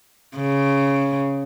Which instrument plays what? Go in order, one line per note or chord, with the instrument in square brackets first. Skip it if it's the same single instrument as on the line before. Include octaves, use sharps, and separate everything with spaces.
[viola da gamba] C#3